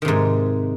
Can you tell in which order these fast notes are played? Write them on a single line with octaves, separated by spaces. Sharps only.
D#3 C3 G#2